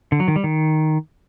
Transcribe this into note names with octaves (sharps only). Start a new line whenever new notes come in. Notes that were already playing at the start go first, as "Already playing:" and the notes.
D3
F#3
D#3
G3
D#3